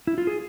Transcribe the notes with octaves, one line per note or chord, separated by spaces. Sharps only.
E4
F4
G#4